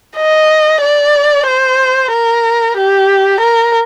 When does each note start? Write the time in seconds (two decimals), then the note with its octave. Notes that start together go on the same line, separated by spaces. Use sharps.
0.17 D#5
0.82 D5
1.47 C5
2.12 A#4
2.77 G4
3.41 A#4